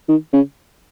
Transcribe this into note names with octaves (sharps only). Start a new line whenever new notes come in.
D#3
C#3